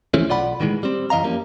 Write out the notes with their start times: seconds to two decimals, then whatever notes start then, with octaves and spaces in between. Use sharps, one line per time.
0.14 E3 F3 A3 C#4
0.29 B1 F4 D5 F#5 B5
0.60 A2 D#3 E3 F#3 G#3
0.83 G3 C4
1.10 F#2 E3 D#5 F5 A#5
1.24 F3 G3 A#3 C#4